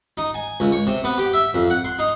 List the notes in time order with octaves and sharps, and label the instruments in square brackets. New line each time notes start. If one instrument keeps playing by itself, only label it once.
[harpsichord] D#4
G#5
C#2
C#5
C3
B3
G4
E5
F2
F#5
C6
D#4